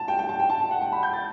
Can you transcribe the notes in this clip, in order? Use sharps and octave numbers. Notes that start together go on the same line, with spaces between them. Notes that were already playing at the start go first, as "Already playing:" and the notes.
Already playing: A5
G5
G5
A5
G5
A5
A5
F#5
G5
B5
G6
A6